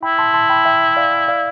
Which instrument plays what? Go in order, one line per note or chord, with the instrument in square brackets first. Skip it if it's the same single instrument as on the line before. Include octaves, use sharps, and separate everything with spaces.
[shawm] E4 [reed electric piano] G5 B5
[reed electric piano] A5 C6
A5 C6
G5 B5
E5 G5
D5 F5
D5 F5